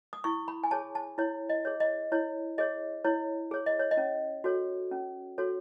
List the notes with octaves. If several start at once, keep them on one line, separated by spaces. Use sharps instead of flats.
D#6
E4 C#6
B5
G#5
G#4 C#5 A5
A5
E4 C#5
D#5
G#4 C#5
D#5
E4 C#5
G#4 C#5 D#5
E4 C#5
G#4 C#5
D#5
C#5
D#5
C#4
F#4 A4 C#5
C#4
F#4 A4 C#5